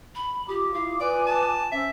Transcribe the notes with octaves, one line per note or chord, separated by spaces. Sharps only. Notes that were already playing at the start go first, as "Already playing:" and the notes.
B5
F4 G4 D6 D#6
E4 F5
B4 D5 G#5
A5
C#4 C5 E5 E6